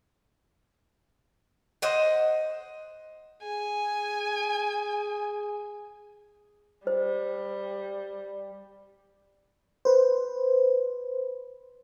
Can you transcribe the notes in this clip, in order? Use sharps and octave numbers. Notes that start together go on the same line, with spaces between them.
C5 D#5 F#5
G#4 G#5
G3 C5
B4 C5